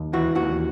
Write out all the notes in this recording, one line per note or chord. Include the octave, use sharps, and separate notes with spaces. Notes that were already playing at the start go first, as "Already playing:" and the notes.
Already playing: D#2
E3 F#4
D#2 F#4